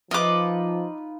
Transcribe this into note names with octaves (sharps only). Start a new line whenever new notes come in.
F3 D#4 F4 B4 D#5 D6